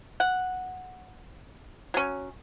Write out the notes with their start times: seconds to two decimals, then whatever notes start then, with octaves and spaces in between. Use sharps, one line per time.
0.20 F#5
1.94 F#3 C#4